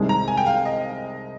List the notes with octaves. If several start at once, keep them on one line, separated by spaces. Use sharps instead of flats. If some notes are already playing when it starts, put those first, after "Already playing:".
Already playing: C2 C3 D#3 G#3
A#5
G#5
G5
F5
D#5